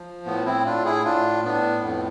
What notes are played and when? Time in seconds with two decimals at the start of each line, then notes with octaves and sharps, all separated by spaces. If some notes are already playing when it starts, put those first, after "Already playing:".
Already playing: F3
0.26 A2 B3
0.46 C4 E4
0.65 A2 D4 F4
0.85 E4 G#4
1.05 A2 D4 F4
1.44 A2 B3 D4
1.83 F2 B3